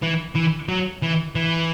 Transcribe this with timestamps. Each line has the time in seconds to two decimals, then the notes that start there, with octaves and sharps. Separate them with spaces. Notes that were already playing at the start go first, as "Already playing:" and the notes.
0.03 E3
0.36 E3
0.69 F#3
1.02 E3
1.35 E3